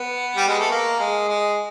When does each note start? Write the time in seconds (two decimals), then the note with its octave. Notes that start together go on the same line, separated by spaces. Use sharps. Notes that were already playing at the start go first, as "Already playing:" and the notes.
Already playing: B3
0.37 G3
0.48 G#3
0.59 A3
0.71 A#3
0.99 G#3
1.28 G#3